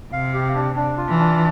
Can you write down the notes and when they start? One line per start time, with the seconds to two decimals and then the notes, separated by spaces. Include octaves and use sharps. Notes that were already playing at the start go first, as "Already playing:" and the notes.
0.12 C3 F5
0.34 G4
0.55 D4
0.76 D4
0.98 F4
1.09 E3
1.19 D4